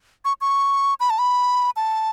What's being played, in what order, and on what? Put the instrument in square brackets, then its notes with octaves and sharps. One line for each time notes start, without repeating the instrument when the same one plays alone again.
[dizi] C#6
C#6
B5
A5
B5
A5